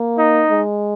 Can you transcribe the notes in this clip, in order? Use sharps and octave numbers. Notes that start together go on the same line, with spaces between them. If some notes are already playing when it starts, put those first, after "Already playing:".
Already playing: A#3
D#4
G#3